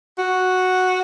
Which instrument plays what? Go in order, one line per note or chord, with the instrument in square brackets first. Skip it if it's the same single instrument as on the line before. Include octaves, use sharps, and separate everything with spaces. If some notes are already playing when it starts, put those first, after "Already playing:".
[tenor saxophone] F#4